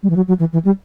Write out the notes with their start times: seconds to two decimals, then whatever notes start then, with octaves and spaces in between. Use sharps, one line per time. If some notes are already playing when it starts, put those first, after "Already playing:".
0.03 G3
0.10 E3
0.16 F#3
0.28 F#3
0.39 E3
0.53 E3
0.65 G3